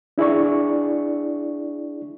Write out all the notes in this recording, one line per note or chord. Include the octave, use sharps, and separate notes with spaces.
D4 E4 G#4 D5 C#6